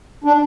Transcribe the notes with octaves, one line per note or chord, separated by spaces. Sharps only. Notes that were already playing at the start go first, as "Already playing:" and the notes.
D4